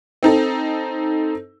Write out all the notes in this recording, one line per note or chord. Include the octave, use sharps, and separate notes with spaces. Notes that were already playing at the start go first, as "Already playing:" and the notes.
C4 D#4 A4